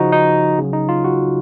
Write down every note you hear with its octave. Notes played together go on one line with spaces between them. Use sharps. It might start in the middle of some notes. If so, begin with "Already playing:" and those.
Already playing: C#3 F3 D#4 F#4
D#4
C#3 F#3
D#4
F4
F#4